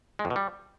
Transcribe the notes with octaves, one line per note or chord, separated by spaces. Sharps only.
G#3
F2
B2
G3